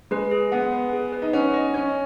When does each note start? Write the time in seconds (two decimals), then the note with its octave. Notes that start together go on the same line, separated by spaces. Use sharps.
0.11 G#3 B4
0.31 G#4
0.52 B3 F#5
0.72 B4
0.93 G#4
1.13 B4
1.22 D#4
1.33 C#4 F#5
1.54 D#5
1.74 C#4 C#5